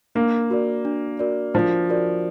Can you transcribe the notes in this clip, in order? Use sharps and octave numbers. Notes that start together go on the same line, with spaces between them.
A#3 D4
F#4 A#4 D5
D4
F#4 A#4 D5
F3 D4
F#4 A#4 D5